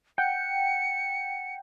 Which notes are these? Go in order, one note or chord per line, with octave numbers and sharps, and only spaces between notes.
F#5 G5 C#7